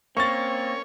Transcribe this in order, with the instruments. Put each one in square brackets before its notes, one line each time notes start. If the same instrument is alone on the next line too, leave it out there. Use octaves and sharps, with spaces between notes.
[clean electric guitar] A#3 [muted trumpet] C4 [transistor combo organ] C#4 C#5 [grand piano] C#6 A6